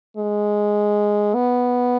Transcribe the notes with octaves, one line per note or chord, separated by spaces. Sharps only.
G#3
B3